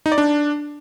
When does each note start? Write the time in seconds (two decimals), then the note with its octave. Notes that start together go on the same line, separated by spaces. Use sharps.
0.06 D#4
0.12 D5
0.18 D4